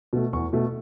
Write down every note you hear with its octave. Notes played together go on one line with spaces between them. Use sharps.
B2 A3
E2 C#6
B2 A3